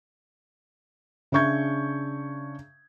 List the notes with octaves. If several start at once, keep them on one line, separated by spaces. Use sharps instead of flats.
C#3 D4 E5 C#6 G6 G#6